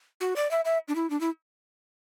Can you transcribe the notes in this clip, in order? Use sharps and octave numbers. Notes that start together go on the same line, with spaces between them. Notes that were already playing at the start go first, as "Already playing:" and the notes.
F#4
D5
E5
E5
D4
E4
D4
E4